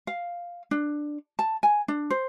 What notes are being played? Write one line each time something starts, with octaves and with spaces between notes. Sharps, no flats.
F5
D4
A5
G#5
D4
C5